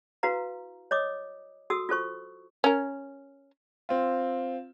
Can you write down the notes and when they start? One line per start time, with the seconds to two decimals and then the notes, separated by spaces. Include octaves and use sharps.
0.23 E4 F#4 B4 F5 A#5
0.91 C#5 D#5 D6 D#6
1.70 F#4 A4 D#6 E6
1.89 F4 A4 C5 C#6
2.64 C#4 A#4
3.89 C4 F4